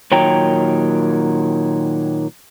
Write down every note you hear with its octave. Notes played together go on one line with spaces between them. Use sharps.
A#2 D#3 F#3 C#5 G5 A#5